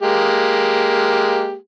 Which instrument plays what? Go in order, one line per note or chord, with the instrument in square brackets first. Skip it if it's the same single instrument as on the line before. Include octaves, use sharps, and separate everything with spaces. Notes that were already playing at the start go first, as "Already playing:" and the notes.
[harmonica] G#3 A#3 G4